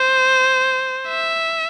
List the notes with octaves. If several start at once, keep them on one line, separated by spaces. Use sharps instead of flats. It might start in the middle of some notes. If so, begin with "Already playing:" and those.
Already playing: C5
E5